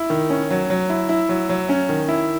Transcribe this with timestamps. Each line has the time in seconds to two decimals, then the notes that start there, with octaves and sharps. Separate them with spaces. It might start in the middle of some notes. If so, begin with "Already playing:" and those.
Already playing: E4
0.10 D#3
0.30 C#4
0.51 F#3
0.70 F#3
0.90 E4
1.09 E4
1.29 F#3
1.49 F#3
1.69 C#4
1.89 D#3
2.09 E4